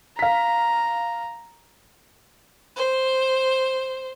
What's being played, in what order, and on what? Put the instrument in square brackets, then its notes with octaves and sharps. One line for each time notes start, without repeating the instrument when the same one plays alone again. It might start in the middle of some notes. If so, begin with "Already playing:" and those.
[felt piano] F5 B6 [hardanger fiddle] A#5
[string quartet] C5